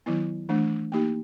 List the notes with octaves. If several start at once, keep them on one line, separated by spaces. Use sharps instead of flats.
D#3 F#3 B3 E4
E3 A3 D4
A#3 D#4 G4